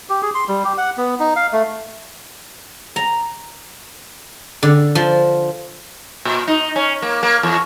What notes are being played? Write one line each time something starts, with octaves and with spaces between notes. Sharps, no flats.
G4
G#4
C6
G3
G4
F#5
B3
D#4
F5
A3
A#5
D3
F3
A#2
D#4
C#4
A#3
A#3
E2